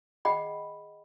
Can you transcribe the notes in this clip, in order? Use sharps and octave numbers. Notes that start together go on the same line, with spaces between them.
G#4 D#5 F#5 G5 B5